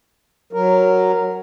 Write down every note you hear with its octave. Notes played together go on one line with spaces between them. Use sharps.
F#3 A#4